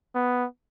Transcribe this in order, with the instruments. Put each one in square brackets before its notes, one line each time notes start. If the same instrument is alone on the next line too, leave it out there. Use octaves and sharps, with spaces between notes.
[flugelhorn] B3